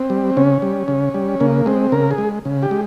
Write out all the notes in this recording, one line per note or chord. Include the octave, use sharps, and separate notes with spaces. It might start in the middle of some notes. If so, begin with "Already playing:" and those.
Already playing: C4
G3
C#3 C#4
G3
C#3
G3
C#3 A#3
G#3 C4
C#3 A#4
G#4
G#3
C#3
G4
G#3